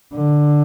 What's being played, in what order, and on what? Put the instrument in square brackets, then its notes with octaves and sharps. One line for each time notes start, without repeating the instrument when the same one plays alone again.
[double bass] D3